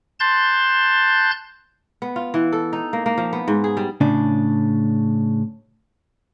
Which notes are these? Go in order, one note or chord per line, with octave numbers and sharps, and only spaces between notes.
A5 C6 F#6 G6 A6
B3
F4
E3
A4
D#4
A#3
A#3
F3
B3
G#2
G#4
G3
A2 C#3 D4